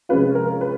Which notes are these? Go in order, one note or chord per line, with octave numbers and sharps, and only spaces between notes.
C3 F3 G#3 C#4 F4 B4
A#4
B4